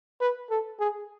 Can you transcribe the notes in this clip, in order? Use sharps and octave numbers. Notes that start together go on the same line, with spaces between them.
B4
A4
G#4